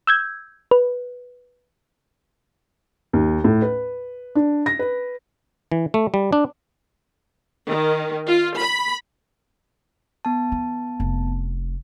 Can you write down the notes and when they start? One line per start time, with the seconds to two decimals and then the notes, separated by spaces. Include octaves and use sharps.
0.07 E6 G6 G#6
0.71 B4
3.13 D#2
3.44 A2
3.62 B4
4.35 D4
4.66 A#6
4.79 B4
5.72 E3
5.94 A3
6.14 G3
6.33 D4
7.68 D#3
8.27 F4
8.59 B5
10.25 B3 A5
10.52 E3
11.00 F1